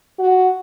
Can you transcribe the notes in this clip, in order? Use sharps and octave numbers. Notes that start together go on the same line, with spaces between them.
F#4